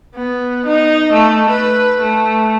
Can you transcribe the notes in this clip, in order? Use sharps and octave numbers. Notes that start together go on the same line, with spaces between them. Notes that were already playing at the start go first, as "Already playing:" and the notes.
B3
D#4
A3
B4
A3